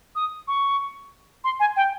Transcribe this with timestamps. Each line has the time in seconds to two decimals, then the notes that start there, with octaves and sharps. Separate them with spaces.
0.15 D#6
0.48 C#6
1.44 C6
1.60 G#5
1.76 G5